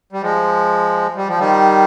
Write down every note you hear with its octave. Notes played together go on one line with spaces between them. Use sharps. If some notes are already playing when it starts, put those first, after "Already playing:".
G3
F3 G#3
G3
F3
D#3 G3